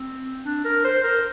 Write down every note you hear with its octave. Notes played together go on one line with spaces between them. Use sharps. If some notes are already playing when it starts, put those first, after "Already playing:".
Already playing: C4
D4
A#4
C5
A#4